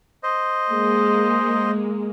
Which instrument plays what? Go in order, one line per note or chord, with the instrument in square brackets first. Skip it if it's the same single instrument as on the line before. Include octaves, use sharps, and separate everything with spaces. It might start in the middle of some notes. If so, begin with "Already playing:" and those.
[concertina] C5 D#5
[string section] G#3 A#3